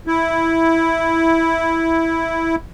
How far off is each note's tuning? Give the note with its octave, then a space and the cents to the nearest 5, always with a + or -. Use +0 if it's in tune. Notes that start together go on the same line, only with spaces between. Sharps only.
E4 -5